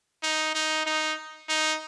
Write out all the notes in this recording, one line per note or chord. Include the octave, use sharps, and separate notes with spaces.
D#4
D#4
D#4
D#4